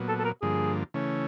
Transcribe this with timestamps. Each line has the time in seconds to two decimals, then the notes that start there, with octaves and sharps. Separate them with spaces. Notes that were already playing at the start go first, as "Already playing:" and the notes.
Already playing: A#2 F#3 B3
0.08 A4
0.19 A4
0.25 A#4
0.42 G2 D3 F3 A#3 G#4
0.94 C#3 E3 A3 C#4